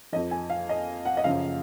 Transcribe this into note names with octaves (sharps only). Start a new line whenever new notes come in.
F2 F3 D#5
G#5
F5
D#5
F#5
D#5
F#2 C#3 F3 F5